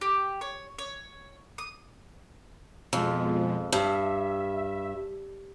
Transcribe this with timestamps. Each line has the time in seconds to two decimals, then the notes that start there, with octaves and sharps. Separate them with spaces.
0.01 G4
0.41 C#5
0.78 C#5
1.58 D#6
2.93 F2 B2 F3 G#3
3.72 G2 E5